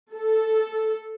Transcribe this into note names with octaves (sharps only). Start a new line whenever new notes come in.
A4